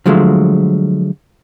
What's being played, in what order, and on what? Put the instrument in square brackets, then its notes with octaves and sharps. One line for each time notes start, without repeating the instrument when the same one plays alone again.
[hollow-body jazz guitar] D3 F3 F#3 G#3 A3